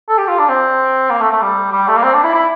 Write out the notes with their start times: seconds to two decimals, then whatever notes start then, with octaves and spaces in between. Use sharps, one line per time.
0.09 A4
0.18 G4
0.28 F4
0.38 D4
0.49 C4
1.11 A#3
1.21 A3
1.31 A3
1.42 G3
1.73 G3
1.88 A3
1.97 A#3
2.03 C4
2.14 D4
2.24 E4
2.34 E4